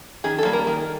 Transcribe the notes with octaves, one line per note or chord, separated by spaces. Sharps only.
D#3 G#4
A4
G3 A#3
A#4
D#3